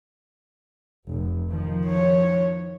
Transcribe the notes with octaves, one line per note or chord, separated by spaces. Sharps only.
F1
D#3 F3
C#5